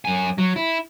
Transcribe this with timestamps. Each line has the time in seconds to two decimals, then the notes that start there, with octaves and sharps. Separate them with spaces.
0.05 F#2 G#5
0.38 F#3
0.56 E4